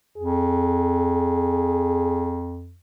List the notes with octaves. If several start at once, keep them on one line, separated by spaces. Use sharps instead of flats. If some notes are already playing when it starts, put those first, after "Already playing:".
F2 G#4